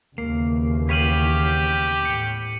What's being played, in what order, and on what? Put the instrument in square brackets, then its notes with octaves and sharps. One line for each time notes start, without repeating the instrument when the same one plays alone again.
[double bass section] D#2 C#3 E3 [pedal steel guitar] A#3 [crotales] C7
[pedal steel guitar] B3 C#5 F5 [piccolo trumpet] G4 [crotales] B6 D#7 F#7
[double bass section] A2 [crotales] C#7